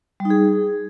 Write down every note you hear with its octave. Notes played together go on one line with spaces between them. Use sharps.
G3
D#4
G#4